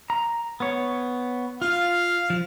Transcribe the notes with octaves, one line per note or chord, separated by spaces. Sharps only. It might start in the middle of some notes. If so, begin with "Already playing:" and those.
A#5
B3 C#5
F4 F5
F3